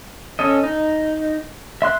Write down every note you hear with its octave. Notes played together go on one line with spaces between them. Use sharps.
C#4 A4 D#5
D#4
E5 C6 F#6